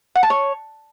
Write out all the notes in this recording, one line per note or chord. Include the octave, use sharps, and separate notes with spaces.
F#5
A5
C#5